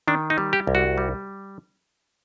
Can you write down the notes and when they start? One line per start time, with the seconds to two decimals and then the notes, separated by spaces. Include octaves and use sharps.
0.08 D#3 D4
0.30 D#4
0.38 G3
0.53 G4
0.67 C2
0.75 F#4
0.98 G3